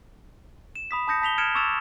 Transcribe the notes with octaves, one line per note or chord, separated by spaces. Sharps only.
E7
B5 D#6 B6
A5 D#6 G6 A#6 C#7
A5 B6 F7 G7
F6 G#6 C#7 D7 E7
C#6 D6 E6 A6 E7 F7